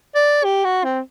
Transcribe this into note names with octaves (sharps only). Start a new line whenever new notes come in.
D5
G4
F#4
C4